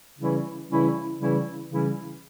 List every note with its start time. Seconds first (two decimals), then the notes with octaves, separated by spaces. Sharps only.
0.19 C#3 E3 G3 C#4 E4
0.70 C#3 E3 G3 C#4 E4
1.20 C#3 E3 G3 C#4 E4
1.70 C#3 E3 G3 C#4 E4